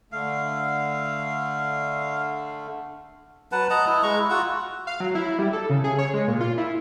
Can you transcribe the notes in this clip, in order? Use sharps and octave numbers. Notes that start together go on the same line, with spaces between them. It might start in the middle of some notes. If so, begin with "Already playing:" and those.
D3 A3 F5
F#3 B4 F#5 A5
D#5 F#5 A5 A#5
E4 D#5
G#3 A#5 C#6
E4
F4 F#4 F#5 E6
F5
F#3
E4
G3
A4
C#3
G#4
C#5
G#3
A#2
F4
E4